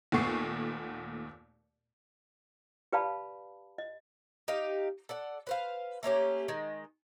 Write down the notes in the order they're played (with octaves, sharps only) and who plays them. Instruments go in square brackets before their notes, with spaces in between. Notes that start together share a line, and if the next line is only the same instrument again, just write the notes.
[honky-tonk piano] D#2 A#2 A3 B3 C#6 C7
[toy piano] G4 B4 D5 F5 A5 B5
D#5
[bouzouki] D#4 G4 F5
A4 D5 F#5
B4 C5 F5
A3 A#3 C#4 G4
D#3 G#3